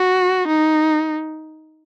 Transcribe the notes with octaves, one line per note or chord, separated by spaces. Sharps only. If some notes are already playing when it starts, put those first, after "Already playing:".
Already playing: F#4
D#4